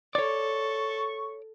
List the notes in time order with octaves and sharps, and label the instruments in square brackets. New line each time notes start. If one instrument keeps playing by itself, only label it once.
[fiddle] A4 [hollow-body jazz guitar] C#5 D5 [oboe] C#6